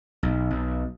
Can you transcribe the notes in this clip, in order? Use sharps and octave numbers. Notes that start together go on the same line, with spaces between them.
B1
B1